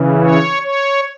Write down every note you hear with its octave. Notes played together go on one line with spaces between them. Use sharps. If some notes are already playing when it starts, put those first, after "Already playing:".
Already playing: C#3 E3
C#5
C#5